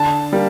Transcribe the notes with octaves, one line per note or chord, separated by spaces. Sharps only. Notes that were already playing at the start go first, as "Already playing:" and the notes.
Already playing: D3 A5
G3 A#3